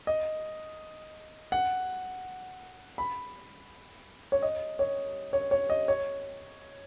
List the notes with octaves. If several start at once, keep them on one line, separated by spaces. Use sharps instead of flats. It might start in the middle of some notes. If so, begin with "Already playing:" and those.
D#5
F#5
B5
C#5
D#5
C#5
C#5
C#5
D#5
C#5